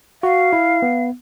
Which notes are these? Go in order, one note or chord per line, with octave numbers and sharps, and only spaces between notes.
F#4 F5
E4
B3